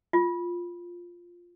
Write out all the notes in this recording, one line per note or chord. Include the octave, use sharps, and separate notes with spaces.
F4